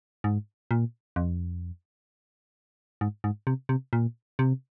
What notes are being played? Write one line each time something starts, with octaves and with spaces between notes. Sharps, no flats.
G#2
A#2
F2
G#2
G#2
C3
C3
A#2
C3